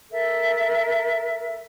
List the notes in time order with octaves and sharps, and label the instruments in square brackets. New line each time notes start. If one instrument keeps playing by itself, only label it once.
[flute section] A4 A#4 E5